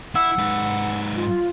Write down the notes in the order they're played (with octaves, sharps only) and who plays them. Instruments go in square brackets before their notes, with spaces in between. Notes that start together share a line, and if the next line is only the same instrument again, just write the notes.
[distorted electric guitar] E4 [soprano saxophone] F#5 [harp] E6
[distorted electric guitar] G#2 B4
[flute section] F4